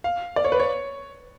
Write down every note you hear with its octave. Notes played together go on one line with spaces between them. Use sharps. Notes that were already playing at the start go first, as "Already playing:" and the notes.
F5
D5
C#5
B4
C#5